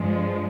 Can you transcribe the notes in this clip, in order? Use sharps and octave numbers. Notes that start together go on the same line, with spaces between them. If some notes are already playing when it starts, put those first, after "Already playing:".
Already playing: G2 F3 G#3